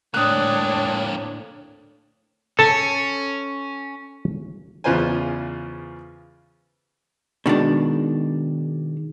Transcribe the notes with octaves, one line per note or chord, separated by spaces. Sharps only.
D2 A2 A#3 C4 D4 C#5 D#6 F#6
C#4 A4 A5
E2 C#3 F4 B4 C5 G#5
B2 D#3 G#3 D4